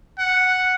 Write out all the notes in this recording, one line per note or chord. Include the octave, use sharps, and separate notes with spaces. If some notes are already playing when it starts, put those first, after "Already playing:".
F#5